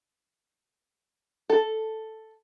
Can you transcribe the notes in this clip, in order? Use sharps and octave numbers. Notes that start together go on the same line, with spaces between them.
A4